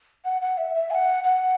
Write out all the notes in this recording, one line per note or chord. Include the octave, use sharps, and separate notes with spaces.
F#5
F#5
E5
E5
G#5
F#5
F#5